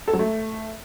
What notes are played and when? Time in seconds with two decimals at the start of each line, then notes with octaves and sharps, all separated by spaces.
0.08 A4
0.13 F#3
0.19 A3